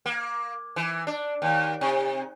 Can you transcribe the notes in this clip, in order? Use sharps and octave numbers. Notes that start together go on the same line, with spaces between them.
A#3
E3
D4
D#2
C3